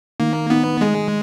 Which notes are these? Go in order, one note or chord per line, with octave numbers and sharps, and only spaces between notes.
D#3 A#3
B3 D#4
G#3 G#4